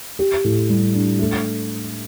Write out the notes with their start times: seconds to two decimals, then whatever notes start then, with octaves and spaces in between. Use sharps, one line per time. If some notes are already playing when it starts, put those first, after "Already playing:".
0.19 G4
0.44 A2
0.69 G3
0.94 D4
1.19 A3